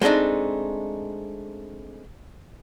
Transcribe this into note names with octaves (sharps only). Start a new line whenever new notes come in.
G#3 A3 C4 D4 D#4